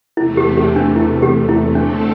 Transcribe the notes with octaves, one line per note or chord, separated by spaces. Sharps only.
E2 C3 A3 E4
G4
G4
D4
E4
G4
E4
D3 A3 C4 D4 A4